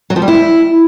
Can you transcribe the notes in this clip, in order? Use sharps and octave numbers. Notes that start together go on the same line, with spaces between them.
F#3
F3
G3
E4